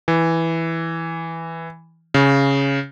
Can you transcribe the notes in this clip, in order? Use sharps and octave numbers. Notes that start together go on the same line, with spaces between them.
E3
C#3